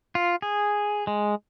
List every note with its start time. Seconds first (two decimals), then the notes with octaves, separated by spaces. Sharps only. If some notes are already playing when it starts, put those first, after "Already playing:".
0.15 F4
0.42 G#4
1.07 G#3